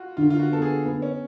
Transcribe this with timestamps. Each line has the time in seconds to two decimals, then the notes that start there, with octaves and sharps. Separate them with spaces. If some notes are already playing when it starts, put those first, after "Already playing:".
Already playing: F4 F#4
0.17 D3 F4
0.30 F4
0.39 F#4
0.51 B3 A4
0.62 G#4
0.85 B3
1.02 C#4